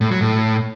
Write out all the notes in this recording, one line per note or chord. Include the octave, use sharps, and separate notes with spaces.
A2
F#3
A2